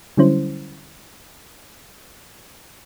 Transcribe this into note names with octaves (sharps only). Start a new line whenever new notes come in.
D3 F#3 G3 C#4 E4 C5